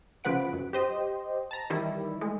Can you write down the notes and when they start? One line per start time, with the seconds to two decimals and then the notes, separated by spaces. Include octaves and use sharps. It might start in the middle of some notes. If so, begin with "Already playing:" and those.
0.24 C#3 F3 B4 F#5 D7
0.53 F#2
0.73 G4 C5 D#5
1.51 A5 A#5
1.70 D#3 E3 G3 E4
2.21 G#3 A3